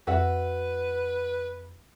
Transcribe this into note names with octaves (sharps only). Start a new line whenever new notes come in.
F2 F#4 B4 E5 F#5